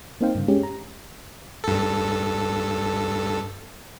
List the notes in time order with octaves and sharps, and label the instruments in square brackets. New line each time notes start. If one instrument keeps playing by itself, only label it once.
[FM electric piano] A#3 C4 D#4 C5 F5 G5
G2 C#3
G#3 C#4 G4
A#5
[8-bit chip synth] G2 A4